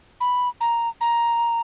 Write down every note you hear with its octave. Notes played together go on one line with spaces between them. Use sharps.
B5
A#5
A#5